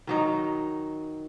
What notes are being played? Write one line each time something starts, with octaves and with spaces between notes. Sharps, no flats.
D#3 F#3 D#4